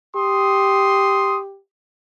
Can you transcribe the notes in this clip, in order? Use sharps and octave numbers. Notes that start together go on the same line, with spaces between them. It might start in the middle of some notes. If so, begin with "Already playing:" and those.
G4 C6 D#6